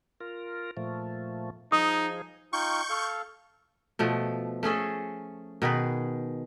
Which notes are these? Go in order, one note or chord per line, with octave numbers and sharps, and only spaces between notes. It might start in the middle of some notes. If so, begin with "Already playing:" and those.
F4 A#4
A#2 F3 A3
F3 D#4 G#4 D#6
D#4 F4 G5 C#6 G6
A4 F5
B2 F3 A3
A3 C#4 G#4 A4
B2 D#3 G#4 B4